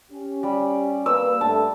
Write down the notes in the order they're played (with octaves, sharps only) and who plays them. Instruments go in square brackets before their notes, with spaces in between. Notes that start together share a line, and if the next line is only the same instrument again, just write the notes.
[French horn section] C#4 G4
[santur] G3
[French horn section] A#3 B4 [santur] E6
[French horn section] G2 A3 [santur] A5